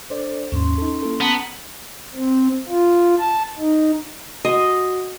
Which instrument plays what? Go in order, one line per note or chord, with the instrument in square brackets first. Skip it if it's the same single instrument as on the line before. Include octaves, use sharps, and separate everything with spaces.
[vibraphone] D4 A4 [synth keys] C5 D5
[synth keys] D#2 G#2 [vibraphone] C#4 C6
[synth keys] D#4 A4
A#3 E4 A4
[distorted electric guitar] B3 [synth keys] A5 A#5 A6
[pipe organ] C4
F4
A5
D#4
[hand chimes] F#4 [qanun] D#5